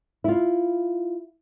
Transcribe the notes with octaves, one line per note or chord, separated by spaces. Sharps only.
E4 F4